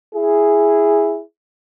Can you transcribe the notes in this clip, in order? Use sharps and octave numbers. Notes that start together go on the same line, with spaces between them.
E4 G#4